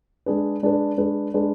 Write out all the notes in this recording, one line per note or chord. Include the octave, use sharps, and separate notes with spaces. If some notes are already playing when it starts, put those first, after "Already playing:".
G#3 D4 G#4 B4
G#3 D4 G#4 B4
G#3 D4 G#4 B4
G#3 D4 G#4 B4